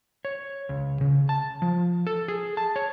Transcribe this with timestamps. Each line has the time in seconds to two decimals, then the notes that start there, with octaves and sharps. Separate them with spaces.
0.25 C#5
0.69 C#2
1.01 C#3
1.29 A5
1.62 F3
2.07 A4
2.28 G#4
2.57 A5
2.76 C#5